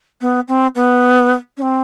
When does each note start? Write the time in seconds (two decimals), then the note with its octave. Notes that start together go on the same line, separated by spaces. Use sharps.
0.21 B3
0.48 C4
0.75 B3
1.57 C#4
1.62 C4